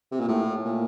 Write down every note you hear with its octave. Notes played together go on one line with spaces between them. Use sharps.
C3
A#2
A2
A#2